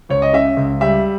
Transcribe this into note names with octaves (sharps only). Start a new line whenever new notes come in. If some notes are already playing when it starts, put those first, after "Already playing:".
C#2 C#5
D#5
C#3 E5
C#2
G3 E5